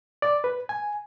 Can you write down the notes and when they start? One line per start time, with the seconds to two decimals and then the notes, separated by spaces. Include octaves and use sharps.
0.22 D5
0.44 B4
0.69 G#5